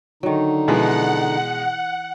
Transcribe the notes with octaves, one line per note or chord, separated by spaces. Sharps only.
D3 D#3 F#3 D#4
B2 E3 F3 G#3 F#5